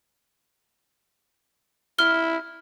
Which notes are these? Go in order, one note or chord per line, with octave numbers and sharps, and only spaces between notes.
E4 F6 G7